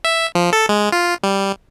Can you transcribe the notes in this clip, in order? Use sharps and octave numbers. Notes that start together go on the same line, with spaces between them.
E5
F3
A4
G#3
F4
G3